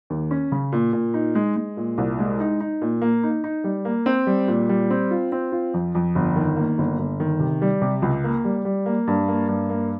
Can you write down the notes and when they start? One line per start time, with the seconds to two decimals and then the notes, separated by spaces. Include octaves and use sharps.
0.10 D#2
0.31 C#4
0.52 C#3
0.72 A#2
0.93 A#2
1.14 D#4
1.35 G#3
1.56 G#3
1.77 A#2
1.98 C2
2.19 G#3
2.40 D#4
2.60 D#4
2.82 A#2
3.02 A#3
3.23 D#4
3.44 D#4
3.64 G3
3.85 A#3
4.06 C4
4.27 G3
4.48 A#2
4.69 G3
4.90 C4
5.11 F4
5.32 C4
5.52 F4
5.74 F2
5.95 F2
6.15 G1
6.36 D#3
6.57 A#3
6.78 G1
6.99 G1
7.20 D#3
7.40 C3
7.62 G3
7.82 C3
8.02 C#2
8.24 A#3
8.45 G3
8.65 G3
8.86 A#3
9.07 G2
9.28 A#3
9.48 G2
9.70 A#3